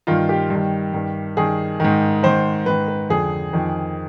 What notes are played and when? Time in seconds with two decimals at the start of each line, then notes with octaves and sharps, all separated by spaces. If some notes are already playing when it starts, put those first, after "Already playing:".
0.07 G2 D#3 F4
0.29 G4
0.50 G2 D#3
0.94 G2 D#3
1.37 G2 D#3 G#4
1.80 G#2 D#3
2.23 G#2 D#3 C5
2.66 G#2 D#3 B4
2.88 B4
3.10 F2 D3 G#4
3.53 F2 D#3